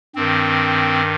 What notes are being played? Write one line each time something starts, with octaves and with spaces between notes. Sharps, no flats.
G2 D#3 C4